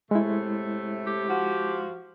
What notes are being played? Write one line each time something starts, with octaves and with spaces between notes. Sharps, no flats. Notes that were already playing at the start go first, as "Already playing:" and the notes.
A2 C3 G#3 A3 E4
G4
F3 F#4